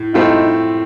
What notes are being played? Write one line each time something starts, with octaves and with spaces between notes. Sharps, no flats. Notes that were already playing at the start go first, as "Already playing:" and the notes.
Already playing: A2
A2 A3 C4 D#4 F4